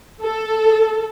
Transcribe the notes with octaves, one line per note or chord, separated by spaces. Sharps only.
A4